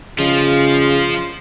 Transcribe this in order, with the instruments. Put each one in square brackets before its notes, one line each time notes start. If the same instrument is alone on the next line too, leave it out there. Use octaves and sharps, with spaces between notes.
[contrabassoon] C#3 [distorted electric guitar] F3 [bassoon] G#3 [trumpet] F4